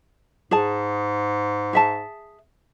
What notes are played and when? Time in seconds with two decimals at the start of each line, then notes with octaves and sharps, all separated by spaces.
0.51 G#2 G#4 A5
1.73 G#4 E5 A5